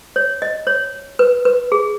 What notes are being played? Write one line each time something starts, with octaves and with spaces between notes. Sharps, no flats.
C#5
D#5
C#5
B4
B4
G#4